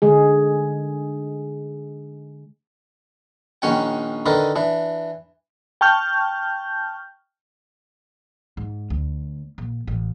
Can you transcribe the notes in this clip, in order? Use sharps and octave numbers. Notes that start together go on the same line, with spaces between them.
D3 G#3 G#4
A#1 D#3 C#4 F#5 G5
D3 D#3 A#4 B4 D5
E3 D4
G5 A5 C#6 F6 G6
G#2
D2
A#1
A1